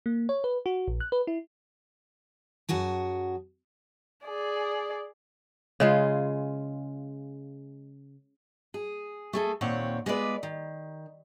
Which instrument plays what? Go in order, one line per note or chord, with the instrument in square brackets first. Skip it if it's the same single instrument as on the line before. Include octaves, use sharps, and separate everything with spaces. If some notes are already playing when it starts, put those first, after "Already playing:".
[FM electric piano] A#3
C#5
B4
F#4
A#1
F#6
B4
E4
[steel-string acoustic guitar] F#2 F#4 G#4 A5
[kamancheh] G#4 D5
[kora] C#3 G#3 F4
[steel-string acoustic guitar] G#4
A3 G#4 A4
D#2 A#2 C4 C#5 F#5
G#3 B3 F4 B4 D5
D#3